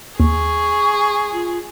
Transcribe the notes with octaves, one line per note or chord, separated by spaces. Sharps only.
D#2 G#4 C#6
F4